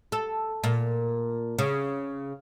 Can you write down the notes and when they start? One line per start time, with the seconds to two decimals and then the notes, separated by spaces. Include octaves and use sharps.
0.12 A4
0.64 A#2
1.59 C#3